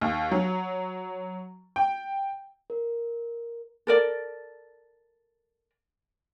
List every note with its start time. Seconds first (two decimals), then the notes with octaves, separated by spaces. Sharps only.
0.01 D#2
0.31 F#3
1.76 G5
2.70 A#4
3.87 A4 A#4 D5